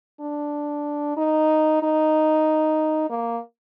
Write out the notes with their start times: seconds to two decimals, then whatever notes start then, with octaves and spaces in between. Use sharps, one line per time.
0.20 D4
1.17 D#4
1.82 D#4
3.10 A#3